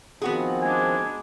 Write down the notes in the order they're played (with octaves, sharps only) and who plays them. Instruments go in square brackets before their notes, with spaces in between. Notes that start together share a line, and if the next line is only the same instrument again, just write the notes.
[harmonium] D#3 F3 C4 [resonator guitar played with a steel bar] B3 F#4 G#4
[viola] G#3 D4 [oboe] G#5